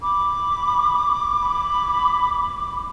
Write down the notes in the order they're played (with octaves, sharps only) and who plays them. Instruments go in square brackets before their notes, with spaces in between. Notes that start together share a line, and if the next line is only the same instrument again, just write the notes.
[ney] B5 [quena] D6
[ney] B5